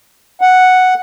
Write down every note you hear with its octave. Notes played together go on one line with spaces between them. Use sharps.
F#5